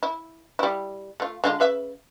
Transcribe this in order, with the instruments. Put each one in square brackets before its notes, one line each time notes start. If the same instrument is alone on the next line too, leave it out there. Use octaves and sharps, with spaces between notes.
[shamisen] E4
G3 E4
A3 F4
D3 G#3 F4
C#3 B4 E5